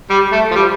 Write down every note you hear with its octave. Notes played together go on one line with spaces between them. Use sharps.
G3
A3
F3
G3